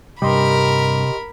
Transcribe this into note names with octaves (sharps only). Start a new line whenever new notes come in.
G2 C3 G3 G4 A#4 D#5 B5 C6